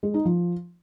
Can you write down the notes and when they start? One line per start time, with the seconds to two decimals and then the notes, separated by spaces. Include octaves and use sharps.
0.03 G#3
0.14 D#4
0.25 F3